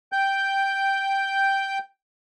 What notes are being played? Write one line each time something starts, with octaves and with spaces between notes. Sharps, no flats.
G5 G6